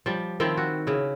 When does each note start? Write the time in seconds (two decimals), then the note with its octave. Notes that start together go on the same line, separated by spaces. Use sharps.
0.06 F3 G3
0.40 D#3 F3 C4 E4
0.57 F#4
0.87 C#3 E4